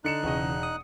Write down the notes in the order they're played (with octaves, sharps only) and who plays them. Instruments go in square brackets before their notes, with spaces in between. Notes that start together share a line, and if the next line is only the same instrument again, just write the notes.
[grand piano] D3 C#7 E7 [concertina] D#4 F#6
[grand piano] E1 D#5 [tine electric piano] C#3 E3
[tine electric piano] D#6